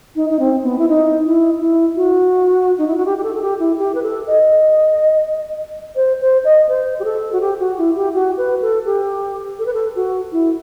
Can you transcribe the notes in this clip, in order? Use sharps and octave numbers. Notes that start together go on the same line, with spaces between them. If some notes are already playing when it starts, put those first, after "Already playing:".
D#4
D#4
C4
B3
E4
D#4
E4
E4
F#4
D#4
E4
F#4
G4
G4
A4
A4
G4
E4
G4
B4
A4
D#5
C5
C5
D#5
C5
G4
A4
F#4
G4
F#4
E4
G4
F#4
B4
A4
G4
A4
B4
A4
F#4
E4